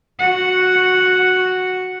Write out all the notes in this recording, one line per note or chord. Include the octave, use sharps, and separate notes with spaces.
F#4 F#5